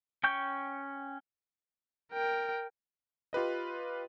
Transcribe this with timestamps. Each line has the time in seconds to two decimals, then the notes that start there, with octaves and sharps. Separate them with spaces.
0.23 C#4 G5 C#6 G6
2.13 A#4 G5
3.33 F4 G4 B4 D#5